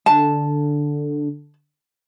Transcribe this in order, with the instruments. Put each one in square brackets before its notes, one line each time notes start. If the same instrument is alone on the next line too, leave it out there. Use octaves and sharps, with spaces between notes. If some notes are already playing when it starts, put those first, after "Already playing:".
[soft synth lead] D3 [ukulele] A5